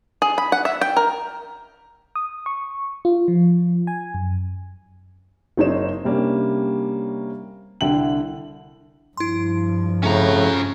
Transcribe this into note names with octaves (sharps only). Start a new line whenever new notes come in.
G#4
B5
F#5
E5
G5
A#4
D#6
C#6
F4
F3
G#5
F#2
F#1 C4 D#4 C5 C#5 E7
C3 G3 A#3 C#4 D4
C2 D3 E4 G5 F#7
G2 F3 E4 C6
F2 A2 C#3 C#4 A#5